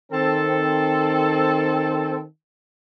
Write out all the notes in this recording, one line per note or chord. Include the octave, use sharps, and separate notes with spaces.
D#3 C4 A4